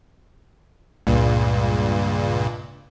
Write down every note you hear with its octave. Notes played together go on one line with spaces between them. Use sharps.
C#2 G2 A#2